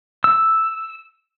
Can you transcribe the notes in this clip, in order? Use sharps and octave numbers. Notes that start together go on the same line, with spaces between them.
E6